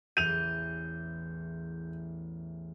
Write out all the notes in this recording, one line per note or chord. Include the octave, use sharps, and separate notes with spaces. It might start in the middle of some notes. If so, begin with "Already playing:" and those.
A1 E2 E3 G6 D#7 F7